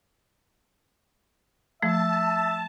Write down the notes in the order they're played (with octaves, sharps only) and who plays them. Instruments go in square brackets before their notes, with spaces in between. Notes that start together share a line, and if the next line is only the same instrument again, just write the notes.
[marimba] F3 A3 [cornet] E5 [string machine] A5